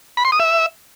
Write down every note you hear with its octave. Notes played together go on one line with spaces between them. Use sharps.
B5
C6
D#6
E5